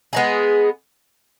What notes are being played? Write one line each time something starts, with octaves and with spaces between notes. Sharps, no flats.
G#3 B3 D#4 G#4